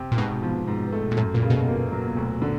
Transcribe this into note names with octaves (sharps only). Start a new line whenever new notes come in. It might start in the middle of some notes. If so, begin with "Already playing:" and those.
Already playing: C3
A#2
G#2 B2
F3
G#2
A3
A#2
F#2 A2
A#2
C#3
B2
A#3
F#3
D2
D3